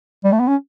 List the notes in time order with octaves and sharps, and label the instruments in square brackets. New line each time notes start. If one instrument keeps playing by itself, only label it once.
[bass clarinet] G3
A3
B3
C#4